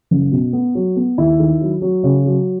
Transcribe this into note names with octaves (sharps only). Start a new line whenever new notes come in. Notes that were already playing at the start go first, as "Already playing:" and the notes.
F#1
B2
B3
F#3
B3
D#2 E4
D#3
F#3
F#3
C#3
F#3